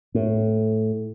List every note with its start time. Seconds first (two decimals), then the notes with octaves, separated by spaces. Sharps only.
0.15 A2